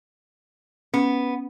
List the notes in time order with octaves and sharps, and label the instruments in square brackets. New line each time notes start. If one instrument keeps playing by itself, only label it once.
[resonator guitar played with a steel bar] B3 [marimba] C#4